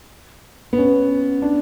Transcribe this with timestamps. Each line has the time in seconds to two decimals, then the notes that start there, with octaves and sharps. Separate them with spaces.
0.73 B3
0.78 C#4
1.42 D4